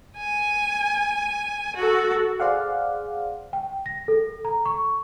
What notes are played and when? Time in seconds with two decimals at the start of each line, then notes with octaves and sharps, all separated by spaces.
0.18 G#5
1.76 F#4 A4
2.40 G#4 C5 D5 F5 F#5
3.53 G5
3.86 A#6
4.08 A4
4.45 A#5
4.65 C#6